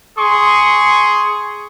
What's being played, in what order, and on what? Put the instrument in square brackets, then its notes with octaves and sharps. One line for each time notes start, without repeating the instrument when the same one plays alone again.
[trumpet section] G#4 C6 C#6 D#6